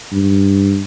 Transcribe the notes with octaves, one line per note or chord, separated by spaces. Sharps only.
G2